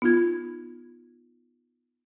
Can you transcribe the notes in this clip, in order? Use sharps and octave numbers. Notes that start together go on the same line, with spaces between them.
B3 D#4 F4 G#6